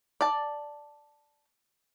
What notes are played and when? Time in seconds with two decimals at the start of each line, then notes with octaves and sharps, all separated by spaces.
0.21 D5 A5